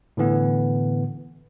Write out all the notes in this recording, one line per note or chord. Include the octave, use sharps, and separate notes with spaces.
A2 D3 E3 B3